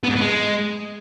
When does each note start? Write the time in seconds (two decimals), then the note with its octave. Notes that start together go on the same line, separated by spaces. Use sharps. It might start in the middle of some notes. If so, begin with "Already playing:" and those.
0.03 B3
0.09 G#2
0.15 B3
0.21 G#3